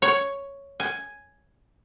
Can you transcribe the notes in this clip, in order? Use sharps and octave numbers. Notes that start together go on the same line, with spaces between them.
C#5
G#5